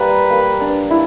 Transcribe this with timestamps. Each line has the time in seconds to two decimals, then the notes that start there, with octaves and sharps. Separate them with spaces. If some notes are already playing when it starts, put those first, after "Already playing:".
Already playing: G3 A#3 B4
0.30 A#3
0.61 D4
0.91 E4